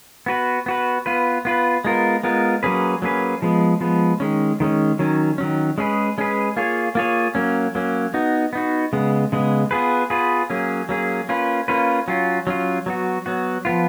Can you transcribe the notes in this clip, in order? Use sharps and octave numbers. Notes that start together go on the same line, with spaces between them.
B3 F#4 B4
B3 F#4 B4
B3 F4 B4
B3 F4 B4
G#3 B3 F4 A#4
G#3 B3 F4 A#4
F#3 A#3 C#4 G#4 B4
F#3 A#3 C#4 G#4 B4
F3 G#3 B3
F3 G#3 B3
D#3 G#3 C#4
D#3 G#3 C#4
D#3 F#3 C#4
D#3 F#3 C#4
G#3 C#4 G#4 B4
G#3 C#4 G#4 B4
A#3 F4 G#4 C#5
A#3 F4 G#4 C#5
F#3 A#3 C#4
F#3 A#3 C#4
B3 D#4 F#4
B3 D#4 F#4
C#3 G#3 B3
C#3 G#3 B3
B3 F4 G#4 B4
B3 F4 G#4 B4
F#3 A#3 C#4 G#4
F#3 A#3 C#4 G#4
A#3 C#4 F4 B4
A#3 C#4 F4 B4
F#3 C#4 F4
F#3 C#4 F4
F#3 B3 F#4
F#3 B3 F#4
F3 B3 F4